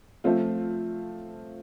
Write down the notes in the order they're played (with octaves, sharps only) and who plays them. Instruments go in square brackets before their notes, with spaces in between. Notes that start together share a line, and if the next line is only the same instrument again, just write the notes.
[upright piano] F3 A3 C4 F4